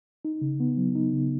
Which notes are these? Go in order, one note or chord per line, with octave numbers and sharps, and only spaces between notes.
D#4
C#3
B3
F#3
D#4
C#3